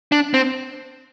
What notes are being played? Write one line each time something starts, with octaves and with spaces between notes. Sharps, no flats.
D4
C4